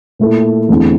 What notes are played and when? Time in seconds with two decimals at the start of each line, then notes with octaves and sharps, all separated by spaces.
0.19 A#2 A3 E4 A4
0.69 E2 D3 A3 C4 E4